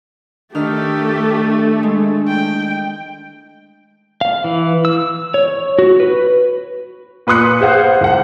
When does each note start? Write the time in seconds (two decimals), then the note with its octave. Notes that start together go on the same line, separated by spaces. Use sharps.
0.55 D#3 A3 D4 G4 A4 F6
1.83 G#3
2.28 G5
4.21 F5
4.44 E3
4.85 E6
5.34 C#5
5.79 F#4
6.00 B4
7.27 A#2 B4 C6 D#6 F#6 C#7
7.61 G#4 C5 F5 F#5
8.01 C#2 F#5